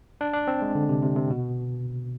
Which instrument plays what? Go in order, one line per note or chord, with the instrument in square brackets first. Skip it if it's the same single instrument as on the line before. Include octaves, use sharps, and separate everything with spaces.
[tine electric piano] D4
D4
C4
G#3
D3
C3
C3
C3
B2